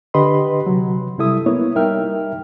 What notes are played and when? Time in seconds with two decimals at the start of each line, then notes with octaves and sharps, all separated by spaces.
0.14 D3 G4 B4 D#5 B5 C6
0.66 C3 F#3
1.19 C3 G3 E4 A4 E5 D#6
1.46 A#3 B3 E4 C#5
1.75 G3 D#4 A#4 E5 G5 F6